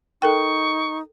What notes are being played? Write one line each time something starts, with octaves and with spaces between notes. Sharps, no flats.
D#4 A4 A#4 G5 C#6